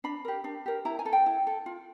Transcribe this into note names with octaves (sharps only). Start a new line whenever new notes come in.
D4 B5
G4 A#4
D4
G4 A#4
E4 A#5
G#5
A4
G5
E4
A4
F4